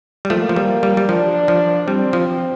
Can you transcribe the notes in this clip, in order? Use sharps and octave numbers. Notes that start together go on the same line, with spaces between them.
G3
F3 A3 A#3
F3
G3
G3
G3
F3 D4
F3
G3 C4
F3